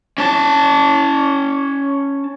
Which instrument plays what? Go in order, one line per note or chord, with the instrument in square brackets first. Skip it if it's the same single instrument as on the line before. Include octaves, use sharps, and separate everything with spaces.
[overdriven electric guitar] C#4 A5